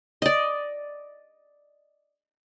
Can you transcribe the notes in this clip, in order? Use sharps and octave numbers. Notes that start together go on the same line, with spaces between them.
D5 D#5